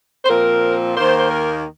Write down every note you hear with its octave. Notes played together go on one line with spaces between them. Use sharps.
C5
A#2 F3 C4 A#4
D#2 D#3 A#3 C5
C5
A#4